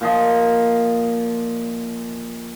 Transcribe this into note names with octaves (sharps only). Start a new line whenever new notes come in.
A#2 F3 D#5